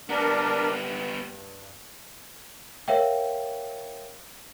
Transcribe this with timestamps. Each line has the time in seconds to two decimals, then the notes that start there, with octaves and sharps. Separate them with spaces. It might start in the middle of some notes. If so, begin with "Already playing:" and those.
0.10 G3 B3 D4 A#4
0.78 G2
2.88 A#4 C#5 E5 F5 G5